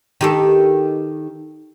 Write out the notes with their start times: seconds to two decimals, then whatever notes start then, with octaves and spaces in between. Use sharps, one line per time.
0.21 D#3 G4 A4